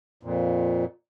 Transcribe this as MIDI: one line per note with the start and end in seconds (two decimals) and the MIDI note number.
0.23 0.85 41
0.23 0.85 46